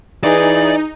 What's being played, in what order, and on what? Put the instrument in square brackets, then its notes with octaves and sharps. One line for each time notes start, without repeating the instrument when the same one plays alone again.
[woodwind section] E3 [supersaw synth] D#4 [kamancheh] G#4 [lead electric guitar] D5